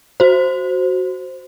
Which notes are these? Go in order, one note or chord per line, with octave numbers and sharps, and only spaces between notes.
F#4 C5